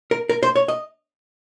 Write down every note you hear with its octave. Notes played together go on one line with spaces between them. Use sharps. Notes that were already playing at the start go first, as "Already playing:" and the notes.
A#4
A#4
C5
C#5
D#5